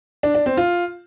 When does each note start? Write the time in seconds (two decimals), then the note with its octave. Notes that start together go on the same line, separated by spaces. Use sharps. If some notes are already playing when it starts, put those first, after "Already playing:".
0.23 D4
0.35 D4
0.46 C4
0.57 F4